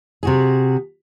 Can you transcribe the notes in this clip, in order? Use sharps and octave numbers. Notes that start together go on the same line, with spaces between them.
C3 F#4 G#4